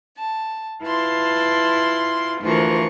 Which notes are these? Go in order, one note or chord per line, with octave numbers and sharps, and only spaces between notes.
A5
E4 F4 B4 A5 C6
D2 E3 F3 F4 A#4 C#6